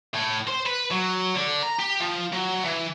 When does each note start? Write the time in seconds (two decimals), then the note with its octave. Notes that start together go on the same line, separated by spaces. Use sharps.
0.14 A2
0.48 C5
0.66 B4
0.91 F#3
1.36 D3
1.63 A#5
1.79 G4
2.00 F3
2.33 F#3
2.64 E3